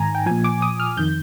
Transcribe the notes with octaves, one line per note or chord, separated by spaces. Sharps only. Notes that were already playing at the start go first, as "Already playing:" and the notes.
Already playing: G#2 D#3 G#5 A#5
G5
A#2 F3 G#5
D6
D#6
F6
F2 D#3 G6